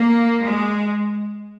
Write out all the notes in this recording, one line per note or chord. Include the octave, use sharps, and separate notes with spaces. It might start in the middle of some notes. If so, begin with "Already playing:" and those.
Already playing: A#3
G#3